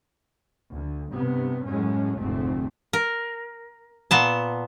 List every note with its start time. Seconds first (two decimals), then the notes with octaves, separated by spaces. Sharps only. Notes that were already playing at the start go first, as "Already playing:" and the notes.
0.70 D2
1.12 G2 C3 B3
1.66 F#2 A2 G#3 C#4
2.18 F1 D2 G#2 A3 C4
2.93 A#4
4.11 A#2 B3 A5